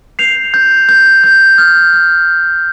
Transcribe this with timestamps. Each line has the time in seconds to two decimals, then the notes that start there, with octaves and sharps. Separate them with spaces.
0.19 G6 C7 F7
0.54 G6
0.89 G6
1.24 G6
1.58 F6
1.93 F6